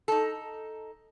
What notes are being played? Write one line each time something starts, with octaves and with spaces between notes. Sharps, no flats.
D#4 A4